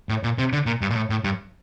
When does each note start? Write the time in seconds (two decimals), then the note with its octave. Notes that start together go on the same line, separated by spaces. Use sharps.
0.09 A2
0.24 A#2
0.38 C3
0.53 D3
0.66 A#2
0.81 G2
0.90 A#2
0.95 A2
1.10 A2
1.24 G2